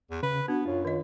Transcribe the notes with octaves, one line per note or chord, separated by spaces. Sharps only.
E2
C#3 B4
B3 D4 F#4
F#2 F4 C#5
D#3 D#5